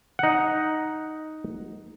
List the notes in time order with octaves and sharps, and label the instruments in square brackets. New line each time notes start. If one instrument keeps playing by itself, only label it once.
[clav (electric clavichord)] D#4 F#5